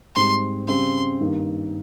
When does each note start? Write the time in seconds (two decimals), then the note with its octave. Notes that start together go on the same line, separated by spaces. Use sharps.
0.16 G#2 G3 C4 C6
0.68 C#3 G3 C4 C6
1.21 G2 D#3 A#3